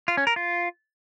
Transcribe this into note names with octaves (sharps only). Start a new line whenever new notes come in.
F4
C#4
A#4
F4